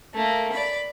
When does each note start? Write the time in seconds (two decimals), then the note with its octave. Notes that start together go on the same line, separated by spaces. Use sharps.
0.14 A3 A#3
0.52 D5 B5